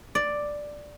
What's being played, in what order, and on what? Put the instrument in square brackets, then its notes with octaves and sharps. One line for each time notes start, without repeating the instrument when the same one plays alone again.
[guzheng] D5